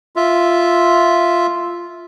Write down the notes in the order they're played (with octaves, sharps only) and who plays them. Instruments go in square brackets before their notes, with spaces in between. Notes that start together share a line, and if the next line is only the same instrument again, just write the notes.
[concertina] F4 E5